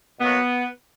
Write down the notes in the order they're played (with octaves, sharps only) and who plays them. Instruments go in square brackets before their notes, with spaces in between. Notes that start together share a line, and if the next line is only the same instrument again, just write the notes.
[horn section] B2 F#3 A#3 B3